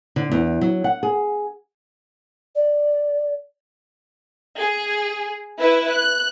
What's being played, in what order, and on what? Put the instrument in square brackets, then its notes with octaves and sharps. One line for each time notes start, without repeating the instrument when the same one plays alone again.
[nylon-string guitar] D3
E2
F#3
F#5
G#4
[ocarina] D5
[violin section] G#4
E4 B4 E5
F#6